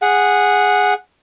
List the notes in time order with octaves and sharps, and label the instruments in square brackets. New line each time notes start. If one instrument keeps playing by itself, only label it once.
[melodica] G#4 F#5